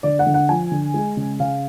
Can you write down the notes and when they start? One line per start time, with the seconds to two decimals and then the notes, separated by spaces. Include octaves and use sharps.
0.03 D3 D5
0.19 F#5
0.26 D3
0.34 F#5
0.49 F3 G#5
0.71 D3
0.94 G#3
1.17 C#3
1.40 C#3 F5